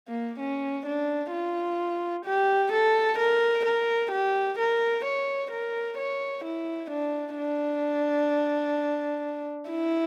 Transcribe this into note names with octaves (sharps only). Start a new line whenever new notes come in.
A#3
C#4
D4
F4
G4
A4
A#4
A#4
G4
A#4
C#5
A#4
C#5
E4
D4
D4
E4